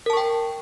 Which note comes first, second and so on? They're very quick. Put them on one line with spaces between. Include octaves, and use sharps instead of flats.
A#4 A5 C#6 G5